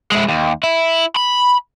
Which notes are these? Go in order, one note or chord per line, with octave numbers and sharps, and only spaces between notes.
G#3 E4
D#2
E4
B5